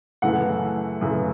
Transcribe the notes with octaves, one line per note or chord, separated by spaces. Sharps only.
F#2 C#3 E3 A3 F#5
F#2 C#3 E3 A3